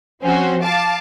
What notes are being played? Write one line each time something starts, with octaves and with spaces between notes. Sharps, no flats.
F3 C4 C#4 F#4 C5
F5 A5 D6 A6